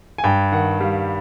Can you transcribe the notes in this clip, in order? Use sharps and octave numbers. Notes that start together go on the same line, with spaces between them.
G#5
G2 G5
D#3 F#5
G3 F5